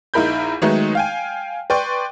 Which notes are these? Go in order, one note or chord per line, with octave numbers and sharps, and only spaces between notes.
A#1 D#4 E4 A#4 B5 G6
D#3 F#3 G#3 A3 B3 D#4
F5 G5 G#5
B4 D5 G5 C6 C#6